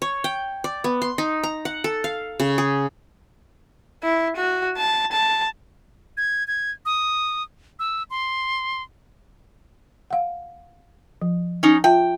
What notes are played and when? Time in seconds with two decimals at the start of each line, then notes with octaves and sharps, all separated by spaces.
0.02 C#5
0.24 G5
0.64 D5
0.84 B3
1.02 C6
1.18 D#4
1.43 A#5
1.65 F#5
1.84 A4
2.04 F5
2.40 C#3
2.58 G#4
4.03 E4
4.36 F#4
4.77 A5
5.12 A5
6.17 G#6
6.48 G#6
6.86 D#6
7.79 E6
8.10 C6
10.10 F5 F#5
11.22 F3
11.63 C#4 D#4
11.84 F4 E5 G5 A5